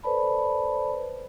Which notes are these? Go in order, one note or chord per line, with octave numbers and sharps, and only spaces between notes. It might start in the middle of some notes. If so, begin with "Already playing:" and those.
A4 B4 C5 D5 A5 B5